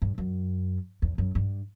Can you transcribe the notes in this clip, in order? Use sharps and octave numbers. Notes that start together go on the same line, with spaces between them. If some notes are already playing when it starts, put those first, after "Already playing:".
G2
F#2
E2
F#2
G2